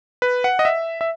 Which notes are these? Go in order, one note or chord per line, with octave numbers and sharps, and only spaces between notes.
B4
F#5
D#5
E5
E5